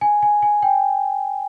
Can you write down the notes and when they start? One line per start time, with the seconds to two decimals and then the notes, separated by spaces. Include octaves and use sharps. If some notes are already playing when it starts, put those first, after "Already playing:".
0.01 G#5
0.23 G#5
0.42 G#5
0.63 G5